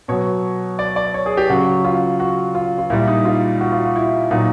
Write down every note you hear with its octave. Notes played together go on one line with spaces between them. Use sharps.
B2 F#3 C#5
D5
D5
C#5
G#4
G4
C#3 F#3 F#4
F4
F#4
F4
F4
A#2 G3 E4
D#4
F4
F#4
F4
F#4
E4
A#2 F#3 D#4